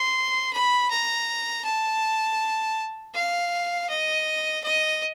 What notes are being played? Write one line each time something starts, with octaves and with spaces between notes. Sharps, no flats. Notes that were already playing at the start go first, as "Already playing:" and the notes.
Already playing: C6
B5
A#5
A5
F5
D#5
D#5